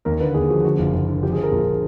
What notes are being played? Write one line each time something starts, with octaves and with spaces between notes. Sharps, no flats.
D#2 A#4
D3 B4
D#2 G#4
F3 F#4
D3 F#4
F#1 F4
F#1
D3
F3 G4
G#4
F3 A#4
A#1 F4